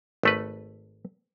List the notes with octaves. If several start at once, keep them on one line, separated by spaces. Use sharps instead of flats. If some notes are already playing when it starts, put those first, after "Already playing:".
G#1 A3 B4